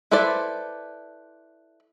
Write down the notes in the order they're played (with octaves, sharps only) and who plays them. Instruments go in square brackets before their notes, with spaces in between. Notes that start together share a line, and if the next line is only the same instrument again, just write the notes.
[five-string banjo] E4 A4 B4 C5 D5